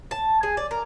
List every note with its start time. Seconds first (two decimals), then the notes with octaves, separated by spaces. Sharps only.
0.11 A5
0.43 G#4
0.57 D5
0.71 A#4